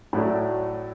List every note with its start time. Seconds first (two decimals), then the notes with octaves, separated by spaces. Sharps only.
0.13 A2 F#3 A3 D4